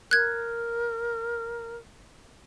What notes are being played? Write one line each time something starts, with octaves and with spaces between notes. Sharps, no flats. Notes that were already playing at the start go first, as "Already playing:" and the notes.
A#4 F#6 G#6